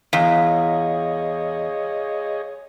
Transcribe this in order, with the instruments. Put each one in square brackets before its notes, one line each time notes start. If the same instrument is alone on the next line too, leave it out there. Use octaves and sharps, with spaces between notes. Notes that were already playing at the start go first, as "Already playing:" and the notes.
[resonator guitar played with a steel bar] E2 [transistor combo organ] G#4 C#5 D#5 [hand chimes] F5